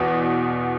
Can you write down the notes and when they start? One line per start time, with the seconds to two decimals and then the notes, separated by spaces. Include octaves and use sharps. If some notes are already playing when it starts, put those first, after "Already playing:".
Already playing: E2 B2 B3